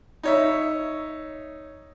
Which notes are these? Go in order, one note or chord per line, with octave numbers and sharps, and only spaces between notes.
D#4 C#5 E5